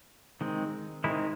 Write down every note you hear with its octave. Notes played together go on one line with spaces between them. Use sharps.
D#3 G#3 C4
D#3 G#3 C4 E4